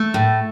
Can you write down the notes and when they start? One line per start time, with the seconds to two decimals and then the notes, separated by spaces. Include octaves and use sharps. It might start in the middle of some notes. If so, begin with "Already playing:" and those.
Already playing: A3
0.14 A2